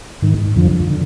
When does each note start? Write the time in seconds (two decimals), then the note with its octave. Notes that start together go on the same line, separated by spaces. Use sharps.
0.22 G#2 D#3
0.56 F2 D3 F3
0.90 D3